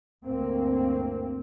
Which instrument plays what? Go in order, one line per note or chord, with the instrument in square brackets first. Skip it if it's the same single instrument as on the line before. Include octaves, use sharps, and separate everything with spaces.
[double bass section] G1 D2 A#3 C4